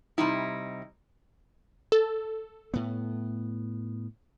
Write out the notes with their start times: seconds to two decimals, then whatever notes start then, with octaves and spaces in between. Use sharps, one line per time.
0.18 C3 G3 D#4 E4
1.92 A4
2.74 A2 B3